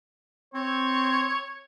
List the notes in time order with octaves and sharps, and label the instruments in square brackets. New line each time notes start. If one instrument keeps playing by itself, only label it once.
[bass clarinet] C4 [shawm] C#5